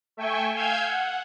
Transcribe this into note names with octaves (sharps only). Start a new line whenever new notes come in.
A3 E5 G5 G#5 C#6
F5 G#5 E6 F6 G6 G#6
F#5